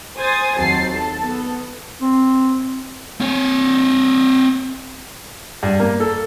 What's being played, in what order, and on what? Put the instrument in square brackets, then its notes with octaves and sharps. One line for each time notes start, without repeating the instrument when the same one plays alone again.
[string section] C5 G#5 D#6 G#6 A6
D#2 F#3 C4 A5 A6 C7
A4 A5
B3 A4
[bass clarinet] C4
[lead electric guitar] C4 C#5
[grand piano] G2
A#3
A4